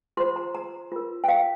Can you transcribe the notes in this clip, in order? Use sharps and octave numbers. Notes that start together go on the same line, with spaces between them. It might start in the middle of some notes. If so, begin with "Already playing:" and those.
F4 C5 C6
A#5
A#5
F4 A#4
G5
F5